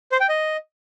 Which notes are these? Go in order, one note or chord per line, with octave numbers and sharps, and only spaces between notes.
C5
G5
D#5